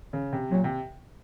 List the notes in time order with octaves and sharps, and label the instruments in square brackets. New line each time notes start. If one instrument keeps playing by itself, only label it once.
[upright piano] C#3
C3
[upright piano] A#2 [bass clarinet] F#3
[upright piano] C3